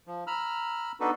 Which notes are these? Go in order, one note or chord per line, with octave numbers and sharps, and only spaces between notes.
F3
A#5 B5 E6 F6
B3 D4 D#4 F#4 A4 B4